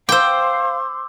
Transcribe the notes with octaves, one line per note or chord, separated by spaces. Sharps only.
C5 F5 G5 C6 D6 E6